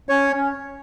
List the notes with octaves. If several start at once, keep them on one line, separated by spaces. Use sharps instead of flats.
C#4 C#5
C#4